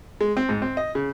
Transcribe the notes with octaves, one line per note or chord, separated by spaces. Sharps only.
G#3
C4
G#2
C4
D#5
C#3